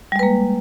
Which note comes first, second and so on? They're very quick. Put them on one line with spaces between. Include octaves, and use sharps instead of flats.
G3 G#3 B4 A#3